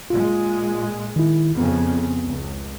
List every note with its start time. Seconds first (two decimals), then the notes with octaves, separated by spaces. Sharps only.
0.10 A#2 G#3 F4
1.16 D#3 E4
1.58 F2 C#3 B3
2.25 C#2